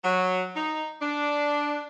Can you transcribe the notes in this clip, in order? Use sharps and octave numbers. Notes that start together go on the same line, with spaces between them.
F#3
D#4
D4